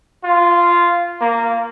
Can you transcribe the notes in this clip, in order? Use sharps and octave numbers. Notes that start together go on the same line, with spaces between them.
F4
A#3